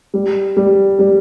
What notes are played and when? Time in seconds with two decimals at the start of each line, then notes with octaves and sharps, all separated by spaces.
0.14 G3
0.57 G3
0.99 G3